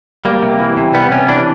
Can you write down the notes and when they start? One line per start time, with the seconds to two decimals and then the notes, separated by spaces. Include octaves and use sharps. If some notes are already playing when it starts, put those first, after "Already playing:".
0.25 G3 A#3
0.42 C3
0.60 E3
0.77 C3
0.94 G3 B3
1.11 C3 C#4
1.28 E3 D4